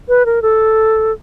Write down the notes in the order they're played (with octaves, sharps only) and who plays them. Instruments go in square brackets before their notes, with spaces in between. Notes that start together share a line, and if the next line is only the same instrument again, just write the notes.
[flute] B4
A#4
A4